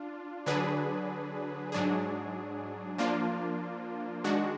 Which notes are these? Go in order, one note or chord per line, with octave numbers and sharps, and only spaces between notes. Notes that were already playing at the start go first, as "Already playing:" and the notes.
Already playing: D4 F4
D3 F#3 D4 G#4 B4
G#2 F#3 D4 G#4
F3 A#3 D4 F4
D#3 G#3 D4 F#4